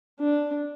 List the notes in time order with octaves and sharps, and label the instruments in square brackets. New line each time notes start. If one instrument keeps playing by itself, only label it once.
[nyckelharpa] D4